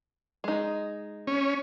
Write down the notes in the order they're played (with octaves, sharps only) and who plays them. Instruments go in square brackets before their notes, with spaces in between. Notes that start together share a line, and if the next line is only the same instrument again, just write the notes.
[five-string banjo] G#3 D#4
[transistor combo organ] C#4